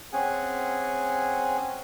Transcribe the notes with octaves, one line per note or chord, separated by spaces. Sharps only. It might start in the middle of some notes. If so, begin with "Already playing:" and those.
C4 C#4 G#4 F#5 G#5